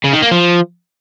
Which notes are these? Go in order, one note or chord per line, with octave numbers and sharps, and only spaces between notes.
C#3
D#3
A#3
F3